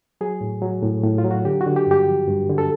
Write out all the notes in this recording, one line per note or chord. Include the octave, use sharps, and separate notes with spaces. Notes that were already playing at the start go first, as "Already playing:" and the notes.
F#3 G#4
A2
F#3
A2
A2
F4
F#3
F#4
D3 G4
F#4
D3
G4
G2 G4
F3
G2
D3
A4